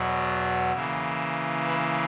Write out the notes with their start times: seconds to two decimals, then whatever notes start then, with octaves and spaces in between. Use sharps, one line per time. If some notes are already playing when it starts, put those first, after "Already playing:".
Already playing: E2 B2 F#3
0.73 C#3 E3 A#3
1.66 B4